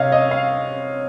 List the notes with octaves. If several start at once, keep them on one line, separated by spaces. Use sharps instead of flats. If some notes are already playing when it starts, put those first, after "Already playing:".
Already playing: C3 C#5 D#5 F5
D#5
F5